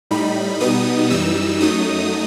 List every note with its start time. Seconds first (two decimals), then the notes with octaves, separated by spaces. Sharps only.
0.11 A2 G3 D#4 B5
0.60 B2 G3 B3 D#4 D#6
1.10 F#2 E3 G3 D#4 E6
1.60 F#2 F#3 A3 D#4 D#6